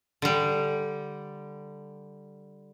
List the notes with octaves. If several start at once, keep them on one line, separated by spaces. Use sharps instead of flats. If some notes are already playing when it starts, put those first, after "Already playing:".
D3 G3